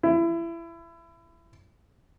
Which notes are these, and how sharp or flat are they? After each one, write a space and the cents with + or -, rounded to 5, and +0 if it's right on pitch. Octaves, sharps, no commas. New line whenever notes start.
E4 +25